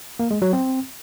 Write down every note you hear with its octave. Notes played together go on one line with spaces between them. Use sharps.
A#3
G#3
F#3
C4